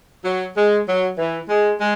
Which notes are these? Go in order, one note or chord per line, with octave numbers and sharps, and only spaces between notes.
F#3
G#3
F#3
E3
G#3
G#3